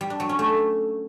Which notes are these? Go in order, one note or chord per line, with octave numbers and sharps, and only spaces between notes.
G3
D4
F#3
C#4
A3